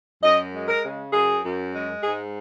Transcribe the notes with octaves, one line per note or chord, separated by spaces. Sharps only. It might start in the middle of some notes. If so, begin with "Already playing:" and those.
F#2 D#5
G#3
A#4
C#3
F#2 G#4
F#2
G#3
G#2 G#4